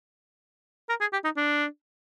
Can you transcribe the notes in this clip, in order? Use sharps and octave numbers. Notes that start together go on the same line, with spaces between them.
A#4
G#4
G4
D#4
D4